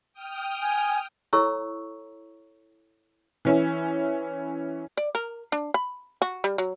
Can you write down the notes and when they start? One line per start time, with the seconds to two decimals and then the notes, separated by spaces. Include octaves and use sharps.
0.13 G5 D#6 F6
0.62 G#5
1.33 E4 A4 C#5 A#5 C#6 E6
3.45 E3 C#4 E4
4.97 D5
5.15 A#4
5.52 D4
5.74 B5
6.22 F#4
6.44 G3
6.58 F#3